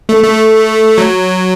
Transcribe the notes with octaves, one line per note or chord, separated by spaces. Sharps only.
A3
A3
F#3